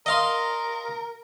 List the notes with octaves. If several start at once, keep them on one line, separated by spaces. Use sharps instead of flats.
A#4 D#5 F5 C6